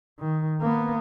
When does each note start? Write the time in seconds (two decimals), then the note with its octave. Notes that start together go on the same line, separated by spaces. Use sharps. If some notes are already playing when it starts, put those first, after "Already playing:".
0.19 D#3
0.61 A#3 B3